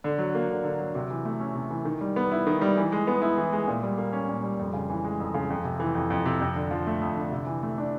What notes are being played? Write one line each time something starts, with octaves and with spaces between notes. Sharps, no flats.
D3
F#3
A#3
D3
D3
F#3
C3
E3
A3
C#4
C3
E3
D#3
G3
B3
E4
D#3
G3
E3
G#3
B3
E4
E3
G#3
A#2
G3
A#3
C#4
A#2
G3
F2
C#3
E3
G#3
F2
C#3
F2
C3
E3
F2
F2
C3
F2
D3
F3
A3
F2
D3
C3
E3
A3
D4